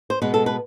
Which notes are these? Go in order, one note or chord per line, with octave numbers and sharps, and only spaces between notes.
C5
B2 G#3 B3 B4
A4
B4